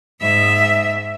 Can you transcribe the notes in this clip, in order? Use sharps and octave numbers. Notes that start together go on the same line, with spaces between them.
G#2 E5